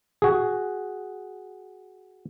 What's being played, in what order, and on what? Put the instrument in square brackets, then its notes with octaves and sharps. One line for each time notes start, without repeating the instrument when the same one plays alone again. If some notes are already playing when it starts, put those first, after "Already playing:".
[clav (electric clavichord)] F#4 G#4